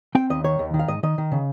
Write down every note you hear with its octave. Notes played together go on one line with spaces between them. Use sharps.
C4 G5
D#2 D#5
D#3 C#5
D#2
D#3
F5
G#2 D#5
D#3 D#5
D#3
C#3